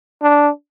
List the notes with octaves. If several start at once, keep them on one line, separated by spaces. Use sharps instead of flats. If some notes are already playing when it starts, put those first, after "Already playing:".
D4